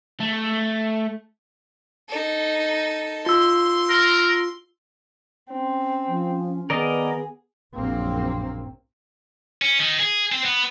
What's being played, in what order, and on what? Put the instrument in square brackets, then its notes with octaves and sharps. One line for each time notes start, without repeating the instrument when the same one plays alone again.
[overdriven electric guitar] A3
[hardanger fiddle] D#4 A4
[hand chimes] F4 E6 [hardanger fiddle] C6
[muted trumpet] A#4
[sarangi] C4 [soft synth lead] C#4
[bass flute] F3
[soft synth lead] D#3 [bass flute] B3 [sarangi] G#4 [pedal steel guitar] A#4 D5 D#5
[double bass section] A#1 F#2 A#3 C4
[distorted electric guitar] C#4
D#3
G#4
C4
B3